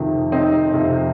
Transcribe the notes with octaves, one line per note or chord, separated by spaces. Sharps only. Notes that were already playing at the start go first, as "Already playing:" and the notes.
Already playing: F2 C3 D#3
C4 D#4
F2 C3 F3